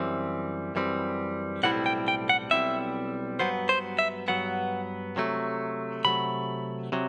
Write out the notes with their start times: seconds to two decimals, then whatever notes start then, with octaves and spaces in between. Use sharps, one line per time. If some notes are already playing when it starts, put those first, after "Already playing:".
Already playing: F#2 E3 G3 C4
0.75 F#2 E3 G3 C4
1.63 B1 A2 G3 C4 E4 F#5
1.86 G5
2.08 G5
2.29 F#5
2.51 B1 A2 G3 C4 E4 E5
3.39 G2 F#3 B3 C5
3.69 C5
3.99 E5
4.28 G2 F#3 B3 F#5
5.16 C3 F#3 A3
6.05 C3 F#3 A3 B5
6.92 C3 F#3